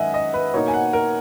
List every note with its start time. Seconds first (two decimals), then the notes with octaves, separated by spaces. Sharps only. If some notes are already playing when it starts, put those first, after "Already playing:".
Already playing: F#2 D#3 G#3 D#5 E5 F#5 G#5
0.14 D#5
0.34 B4
0.53 B2 A#3 D#4 C#5
0.68 G#5
0.74 F#5
0.93 A#4